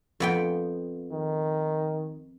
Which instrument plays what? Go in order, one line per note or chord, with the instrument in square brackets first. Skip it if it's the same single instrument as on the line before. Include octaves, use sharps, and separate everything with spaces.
[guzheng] F2 B3 G5
[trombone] D#3